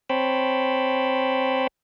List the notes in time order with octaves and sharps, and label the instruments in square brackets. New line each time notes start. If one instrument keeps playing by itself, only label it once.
[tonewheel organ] C4 C5 C#5 G5 A5 B5